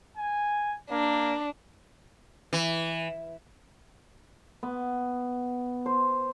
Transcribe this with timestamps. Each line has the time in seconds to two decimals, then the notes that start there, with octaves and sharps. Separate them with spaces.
0.17 G#5
0.91 A#3 D4
2.53 E3
4.63 B3
5.86 C5